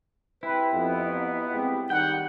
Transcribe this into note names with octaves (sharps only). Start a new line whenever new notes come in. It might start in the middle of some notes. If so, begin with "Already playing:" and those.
C4 E4 G4 B4
F2 B3 D#4 F5
F#3 D#4
G2 G#3 C4 G4 G5
D#3 G3 D#4 F#4 F#5 G5